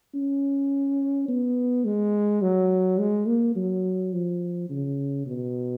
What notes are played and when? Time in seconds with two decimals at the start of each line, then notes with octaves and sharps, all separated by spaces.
0.14 C#4
1.29 B3
1.85 G#3
2.42 F#3
2.99 G#3
3.27 A#3
3.56 F#3
4.13 F3
4.70 C#3
5.27 B2